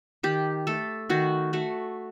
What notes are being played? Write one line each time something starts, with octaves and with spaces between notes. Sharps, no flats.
D#3 G4
A3 A4
D#3 F#4
A3 F#4